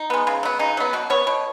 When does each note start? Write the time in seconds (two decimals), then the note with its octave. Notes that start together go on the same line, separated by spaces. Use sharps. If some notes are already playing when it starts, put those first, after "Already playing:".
Already playing: D#4
0.10 G#3 B3
0.27 C#3
0.43 F#3 B3
0.59 C#3 D#4
0.77 F#3 B3
0.93 B2 F#4
1.10 B3 C#5
1.27 B2